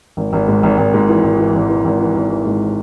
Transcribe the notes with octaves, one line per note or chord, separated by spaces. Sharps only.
G#1
G#1
G#2
G#1
G#1
G#2
E3
G#1
E3
G#1
E3
G#1
E3
G#1
E3
G#2